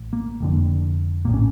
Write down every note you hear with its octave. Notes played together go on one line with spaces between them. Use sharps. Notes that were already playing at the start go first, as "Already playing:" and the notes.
Already playing: A1 A2
A#3
F1 F2 D3
A#1 A2 A#3 C#4